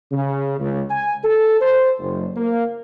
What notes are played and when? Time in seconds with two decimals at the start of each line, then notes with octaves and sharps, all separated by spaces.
0.11 C#3
0.59 C#2
0.91 G#5
1.24 A4
1.60 C5
1.99 F#1
2.36 A#3